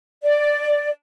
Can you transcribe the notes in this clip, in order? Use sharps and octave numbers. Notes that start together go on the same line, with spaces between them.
D5